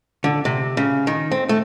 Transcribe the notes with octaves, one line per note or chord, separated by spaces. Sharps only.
D3
C3
C#3
D#3
C4
A3